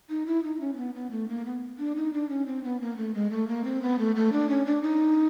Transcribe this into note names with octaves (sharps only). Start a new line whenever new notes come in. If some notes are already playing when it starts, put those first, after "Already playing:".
D#4
E4
D#4
C#4
C4
B3
B3
A3
A#3
B3
D4
D#4
D4
C#4
C4
B3
A#3
A3
G#3
A3
A#3
C4
B3
A3
A3
D4
C#4
D4
D#4